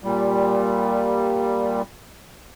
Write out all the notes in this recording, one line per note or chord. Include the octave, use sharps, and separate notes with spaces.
A#2 G3